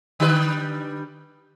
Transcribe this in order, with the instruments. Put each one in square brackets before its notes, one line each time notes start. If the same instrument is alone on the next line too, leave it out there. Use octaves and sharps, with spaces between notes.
[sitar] D3 G3 B4